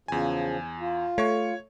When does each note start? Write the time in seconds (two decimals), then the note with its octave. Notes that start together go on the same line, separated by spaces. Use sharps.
0.08 E2 C#3 F3 G#5
0.80 F4
1.18 A3 C#5 C#6